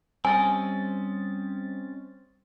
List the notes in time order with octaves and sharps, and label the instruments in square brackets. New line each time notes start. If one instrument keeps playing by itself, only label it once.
[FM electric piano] G3 A6 [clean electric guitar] C4 C#4 D#5 [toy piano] G#5